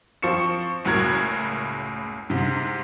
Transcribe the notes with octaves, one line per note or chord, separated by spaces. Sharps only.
F3 C4 C#6 C#7 E7
F#1 C#2 A2 F#4 A#4 G#6
G#2 C3